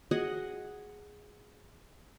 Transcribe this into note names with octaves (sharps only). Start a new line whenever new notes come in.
F#4 G#4 D#5 F#5